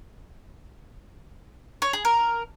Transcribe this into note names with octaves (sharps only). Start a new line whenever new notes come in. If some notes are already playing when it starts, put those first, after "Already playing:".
C#5
G#4
A#4